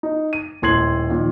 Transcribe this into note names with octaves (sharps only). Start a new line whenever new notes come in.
D#4
D#7
D#1 A2 C6 G#6 C7 F#7
A#2 D#3 F3